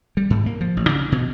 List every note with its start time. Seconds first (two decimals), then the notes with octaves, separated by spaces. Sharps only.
0.17 G3
0.30 G#2
0.46 A#3
0.61 F3
0.77 A1
0.89 C#3
1.12 B2